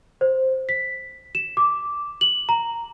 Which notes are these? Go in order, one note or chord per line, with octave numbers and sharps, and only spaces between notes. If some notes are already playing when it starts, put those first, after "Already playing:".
C5
B6
E7
D6
F#7
A#5